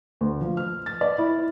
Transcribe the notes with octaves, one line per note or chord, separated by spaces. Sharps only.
D2
F3
F6
A6
D5
E4